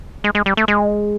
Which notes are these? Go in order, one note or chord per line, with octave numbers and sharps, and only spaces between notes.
G#3
G#3
G3
A3
G#3